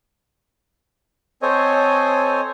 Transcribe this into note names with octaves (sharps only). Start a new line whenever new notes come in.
C4 A4 C5 C#5 D#5 G#5